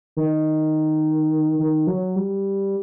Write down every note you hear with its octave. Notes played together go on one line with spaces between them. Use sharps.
D#3
D#3
F#3
G3